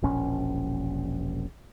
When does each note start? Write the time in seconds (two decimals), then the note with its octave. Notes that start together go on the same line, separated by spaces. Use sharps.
0.02 E1 A#1 C#4